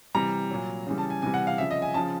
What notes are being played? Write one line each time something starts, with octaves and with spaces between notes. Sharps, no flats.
C3 E3 G3 A#5
A#2 F#3
C#3 E3 G3
A5
G#5
C3 E3 G3 G#5
F#5
F5
C#3 F3 E5
D#5
G#5
C#3 F3 A5